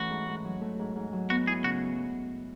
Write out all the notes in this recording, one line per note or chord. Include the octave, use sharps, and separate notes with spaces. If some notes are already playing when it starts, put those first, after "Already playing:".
Already playing: E3 A3 C#4 F#4
G#2
G#2
F#3
A3
G#2
G#2
F#3
B3 F#4
E4 G#4
C#3 F#4